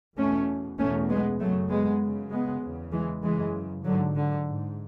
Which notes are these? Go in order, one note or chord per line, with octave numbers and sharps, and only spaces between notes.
E2 B2 A3 C#4
E2 B2 A3 C#4
G#3 B3
F#2 C#3 F#3 A3
G#3 B3
F#2 C#3
G#3 B3
E2 C#3
E3 G#3
F#2 C#3 E3 G#3
G#2 D3 F#3
D3
G#2